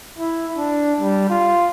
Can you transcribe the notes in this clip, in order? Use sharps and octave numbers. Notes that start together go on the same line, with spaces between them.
E4
D4
G3
F4